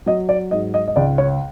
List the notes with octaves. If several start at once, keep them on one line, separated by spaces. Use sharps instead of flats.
F#3 D#5
D5
G#2 D#5
D#5
D#5
C#2 D5
C#5